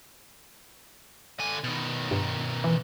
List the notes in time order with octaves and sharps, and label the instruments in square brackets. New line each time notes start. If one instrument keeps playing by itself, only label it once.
[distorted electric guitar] D3 G#5
B2 D#3
[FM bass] G2
E3